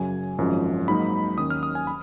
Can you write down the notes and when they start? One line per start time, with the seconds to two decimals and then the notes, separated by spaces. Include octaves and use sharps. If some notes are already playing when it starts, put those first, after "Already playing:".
Already playing: F#2 C#3 F#3 G#5
0.38 G#1 F#2 F3 G#3 C#4
0.88 G#2 F#3 A#3 D#4 B5
1.37 D#2 D#3 F#3 C#4 D#6
1.50 F6
1.63 D#6
1.75 G#5
1.87 B5